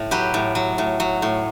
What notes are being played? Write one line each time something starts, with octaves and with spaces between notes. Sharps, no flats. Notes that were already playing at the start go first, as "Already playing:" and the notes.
Already playing: A2
F#3 G4 B4
A2
F#3
A2
F#3
A2